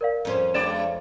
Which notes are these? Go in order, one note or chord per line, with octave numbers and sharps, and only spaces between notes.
A#4 D5 F5
F2 C#4 C5
G2 G#3 D5 E7